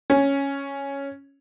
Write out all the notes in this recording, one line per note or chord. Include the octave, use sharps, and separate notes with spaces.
C#4